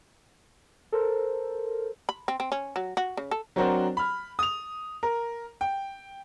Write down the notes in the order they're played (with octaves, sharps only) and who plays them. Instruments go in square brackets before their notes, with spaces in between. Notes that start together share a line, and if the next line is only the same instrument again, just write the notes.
[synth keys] A4 A#4 C5
[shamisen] B5
C4
C4
C#4
F#3
F#4
C#3
A4
[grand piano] F#3 C4 D4 F#4 A#4 C5
B5 F6
D#6 F7
A#4
G5